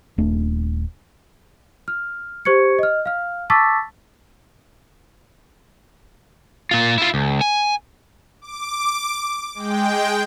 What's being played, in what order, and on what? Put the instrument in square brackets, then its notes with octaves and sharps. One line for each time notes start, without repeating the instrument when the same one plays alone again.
[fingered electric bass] D#1 A3 D4
[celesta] F6
G4 C5 C#6 G#6 C#7
D#5 F6
F5 F6
A5 C#6 D6 E6 A6 B6
[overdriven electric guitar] A#2 F4
E4 F4
C#2
G#5
[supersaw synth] D6
G#3 G5